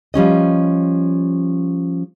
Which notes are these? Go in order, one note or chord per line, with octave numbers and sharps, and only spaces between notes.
F3 G3 C#4 D#5